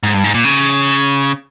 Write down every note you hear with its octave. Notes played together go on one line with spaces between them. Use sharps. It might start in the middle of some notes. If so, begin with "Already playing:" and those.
G#2
G2
G#2
A#2
C#3